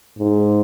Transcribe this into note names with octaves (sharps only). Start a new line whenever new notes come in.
G#2